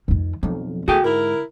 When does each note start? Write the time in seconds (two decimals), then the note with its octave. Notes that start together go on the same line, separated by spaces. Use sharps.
0.08 F2 D#3
0.43 B1 F2 F3
0.88 E2 D3 A3 F#4 G#4 G5
1.04 G#2 E4 A#4